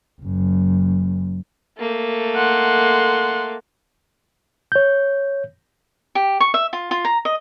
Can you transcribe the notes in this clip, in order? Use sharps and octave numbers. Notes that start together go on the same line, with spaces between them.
F#1 F#2
A3 A#3
F#5 C6
C#5 G6
G4
C#6
E5
F4
F4
A#5
D#5